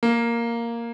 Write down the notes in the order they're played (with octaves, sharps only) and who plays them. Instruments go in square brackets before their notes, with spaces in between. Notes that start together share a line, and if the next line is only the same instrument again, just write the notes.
[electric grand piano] A#3